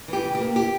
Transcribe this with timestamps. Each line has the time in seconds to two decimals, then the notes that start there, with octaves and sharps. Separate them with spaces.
0.08 E3 G4
0.24 C#3
0.35 G4
0.40 A#3
0.56 G4